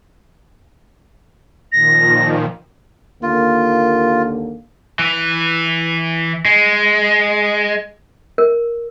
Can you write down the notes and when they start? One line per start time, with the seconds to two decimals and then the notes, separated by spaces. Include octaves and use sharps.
1.72 A#2 D#3 F3 A#6
3.23 D#2 D3 A#3 F4
4.99 E3
6.45 G#3
8.38 A#4